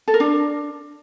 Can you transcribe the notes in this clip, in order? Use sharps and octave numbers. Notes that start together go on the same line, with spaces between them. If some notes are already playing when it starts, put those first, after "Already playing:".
A4
A#4
D4